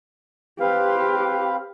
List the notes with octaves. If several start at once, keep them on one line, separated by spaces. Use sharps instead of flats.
C4 G4 B4 F5